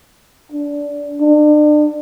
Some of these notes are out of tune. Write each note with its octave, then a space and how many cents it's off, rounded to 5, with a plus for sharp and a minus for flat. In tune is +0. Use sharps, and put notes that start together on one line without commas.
D4 -20
D4 +35